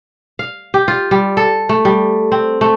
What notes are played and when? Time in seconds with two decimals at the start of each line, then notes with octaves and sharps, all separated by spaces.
0.39 F5
0.74 G4
0.88 F4
1.11 G3
1.37 A4
1.69 A3
1.85 G3
2.32 C4
2.61 A3